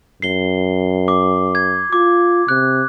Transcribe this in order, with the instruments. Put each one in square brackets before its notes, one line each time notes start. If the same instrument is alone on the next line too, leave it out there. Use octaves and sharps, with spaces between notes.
[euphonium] F#2 [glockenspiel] C7 G7
[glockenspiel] D6
G#6
[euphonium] F4 [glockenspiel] D6
[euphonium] C3 [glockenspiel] F#6